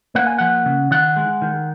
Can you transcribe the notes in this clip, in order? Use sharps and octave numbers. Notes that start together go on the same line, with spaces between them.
A#3 F#5
G#5
F3 F#5
C#3
D#3 F#5
G#3
D#3